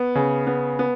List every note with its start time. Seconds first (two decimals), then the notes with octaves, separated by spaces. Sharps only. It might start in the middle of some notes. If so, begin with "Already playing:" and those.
Already playing: B3
0.15 C#3
0.47 B3
0.79 B3